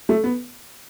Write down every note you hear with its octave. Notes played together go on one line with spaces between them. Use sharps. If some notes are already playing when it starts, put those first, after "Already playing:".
A3
B3